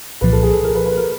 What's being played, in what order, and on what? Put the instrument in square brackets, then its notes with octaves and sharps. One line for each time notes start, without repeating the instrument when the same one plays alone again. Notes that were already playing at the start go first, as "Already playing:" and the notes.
[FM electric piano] C2 A#2 F3 [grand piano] B4
[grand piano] A4
G#4
A4
A#4
B4
B4
A#4